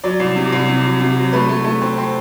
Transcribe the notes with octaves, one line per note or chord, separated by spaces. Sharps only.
F#3 D5
C2
C3
C2
C3
F#3
C3
F#3
A3 B4
A3
A3
C4
C4